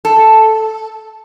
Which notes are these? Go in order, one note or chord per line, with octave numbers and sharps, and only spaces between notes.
A4